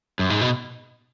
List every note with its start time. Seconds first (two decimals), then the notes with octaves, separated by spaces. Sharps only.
0.19 F#2
0.30 G#2
0.41 B2